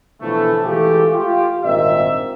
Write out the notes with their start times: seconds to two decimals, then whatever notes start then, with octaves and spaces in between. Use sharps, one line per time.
0.22 B2 D3 E3 F3 A3
0.64 E3 G#3 A3 F4 G4
1.11 F4 G4
1.64 G#1 G2 A#2 C4 D#5 E5